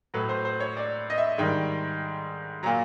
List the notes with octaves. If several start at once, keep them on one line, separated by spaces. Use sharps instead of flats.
A2 F#3 B4
C5
C5
C#5
D5
D#5
E5
G#2 D#3 G3 G5
A#2 F#3 A#5